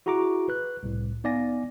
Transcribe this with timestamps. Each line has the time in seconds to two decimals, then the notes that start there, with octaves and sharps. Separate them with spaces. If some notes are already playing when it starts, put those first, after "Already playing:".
0.06 E4 F#4 G#4 A#5 C#6 D6
0.49 B4 F#6
0.83 C2 A2
1.24 B3 D#4 D5 F5 G#5 A#6